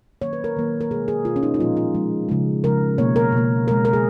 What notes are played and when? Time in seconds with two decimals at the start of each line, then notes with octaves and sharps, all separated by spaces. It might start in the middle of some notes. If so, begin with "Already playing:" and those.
0.21 D#3 F#3 A#3 C#5
0.33 B4
0.44 A#4
0.56 D#3 F#3 A#3
0.81 A#4
0.91 B2 G#3 G#4
1.08 G#4
1.25 B2 G#3 F4
1.36 C#4
1.43 D#4
1.54 D#4
1.59 A#2 F3 G#3 F4
1.77 F4
1.94 A#2 F3 G#3
2.29 C#3 F3 G#3
2.64 C#3 F3 G#3 A#4
2.98 B2 A#3 C#5
3.16 A#4
3.32 B2 A#3
3.68 B2 G#3 A#4
3.85 A#4
3.93 G#4